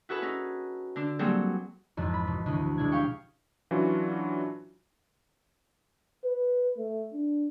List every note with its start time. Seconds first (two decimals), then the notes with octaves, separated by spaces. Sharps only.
0.09 E4 F#4 G#4 A4 B4
0.22 C#4 D#4
0.96 D3 D4
1.19 F#3 G3 A#3 C4 G#4 A4
1.97 G#1 F2 E3
2.14 B5
2.27 B2
2.46 D2 B2 E3
2.78 B2 G#3 D4 E4 G#6
2.91 G4 F5 G5 C#6
3.71 E3 F#3 C#4 D4 F4 F#4
6.25 B4
6.78 A3
7.13 D4